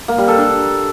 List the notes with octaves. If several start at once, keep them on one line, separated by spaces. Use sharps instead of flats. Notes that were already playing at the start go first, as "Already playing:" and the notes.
A#3
G3
A4
D4